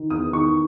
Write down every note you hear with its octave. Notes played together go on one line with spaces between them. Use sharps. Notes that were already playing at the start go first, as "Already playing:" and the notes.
Already playing: D#3
E2 D#6
D#3 C#6